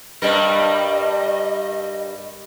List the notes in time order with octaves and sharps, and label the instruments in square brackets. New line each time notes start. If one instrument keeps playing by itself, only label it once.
[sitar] G2 G3 A#4 [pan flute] D#5